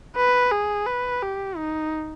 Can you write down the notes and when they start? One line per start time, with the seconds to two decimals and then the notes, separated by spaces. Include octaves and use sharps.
0.16 B4
0.51 G#4
0.86 B4
1.22 G4
1.57 D#4